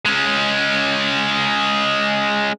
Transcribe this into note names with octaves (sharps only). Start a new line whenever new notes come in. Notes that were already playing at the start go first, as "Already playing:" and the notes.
G#3 C#4